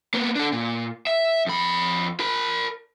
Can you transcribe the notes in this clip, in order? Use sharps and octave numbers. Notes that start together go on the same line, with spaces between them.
A#3 B3
D4 A4
A#2
E5
F2 B5
A#4 B5